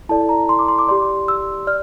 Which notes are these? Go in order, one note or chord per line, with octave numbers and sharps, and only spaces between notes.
E4 A4 D5 A5
A#5
C6
D6
C6
D6
G4 D5 C6
E6
D5 F6